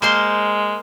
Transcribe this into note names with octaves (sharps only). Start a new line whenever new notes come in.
G#3 A#3 C5 C6